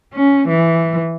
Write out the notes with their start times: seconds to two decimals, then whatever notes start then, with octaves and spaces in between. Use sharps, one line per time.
0.13 C#4
0.48 E3